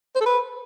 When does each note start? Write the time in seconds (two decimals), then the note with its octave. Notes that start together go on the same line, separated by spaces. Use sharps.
0.15 C5
0.21 A4
0.26 B4